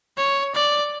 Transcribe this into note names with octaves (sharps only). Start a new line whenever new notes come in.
C#5
D5